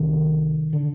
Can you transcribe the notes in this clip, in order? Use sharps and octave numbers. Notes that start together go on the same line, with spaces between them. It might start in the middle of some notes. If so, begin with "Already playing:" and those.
Already playing: C2 C3 D#3
D3